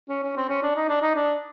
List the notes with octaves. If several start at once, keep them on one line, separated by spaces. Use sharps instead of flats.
C#4
C#4
C4
C#4
D4
D#4
D4
D#4
D4